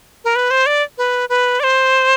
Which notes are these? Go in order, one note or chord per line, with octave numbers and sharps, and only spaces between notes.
A#4
B4
C5
D5
B4
B4
D5
C5